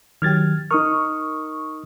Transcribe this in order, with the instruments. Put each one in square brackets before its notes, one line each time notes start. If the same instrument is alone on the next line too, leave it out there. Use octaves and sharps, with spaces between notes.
[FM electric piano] D#3 F#3 G4 [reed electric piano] F6 G#6 A6
[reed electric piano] D#4 D#6 F6 [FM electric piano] A#4 C#6